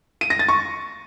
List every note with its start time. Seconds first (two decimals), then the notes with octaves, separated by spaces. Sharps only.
0.21 D#7
0.30 A#6
0.39 A6
0.48 C#6